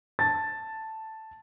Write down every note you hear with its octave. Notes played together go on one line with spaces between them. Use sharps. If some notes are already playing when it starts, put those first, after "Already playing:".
A5 A6